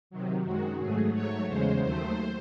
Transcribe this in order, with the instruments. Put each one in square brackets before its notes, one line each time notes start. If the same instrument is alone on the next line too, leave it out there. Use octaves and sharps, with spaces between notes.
[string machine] C3 D#3 F#3
F#2 D#3 G#3 F#4
G#2 F#3 A3 G#4
G#2 F#3 A3 C#5
E2 C#3 G#3 C5
D#2 D#3 F#3 A3 C5